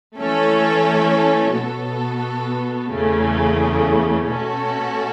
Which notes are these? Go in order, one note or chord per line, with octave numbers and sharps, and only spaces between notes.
E3 A3 C#4 A4 C#5
B2 B3 F#4 A4
E2 C#3 A3
B2 A3 C#4 F#4 A4